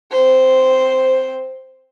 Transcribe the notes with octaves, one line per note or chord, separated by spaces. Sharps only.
C4 C5